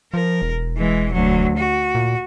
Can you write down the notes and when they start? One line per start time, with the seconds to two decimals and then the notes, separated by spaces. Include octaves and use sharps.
0.14 F3 A#4
0.42 E1
0.77 E3 G#3
1.12 D2 F#3
1.57 F#4
1.95 A#2